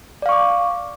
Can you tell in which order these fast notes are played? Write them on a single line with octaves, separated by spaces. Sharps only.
D5 F5 C#6 D6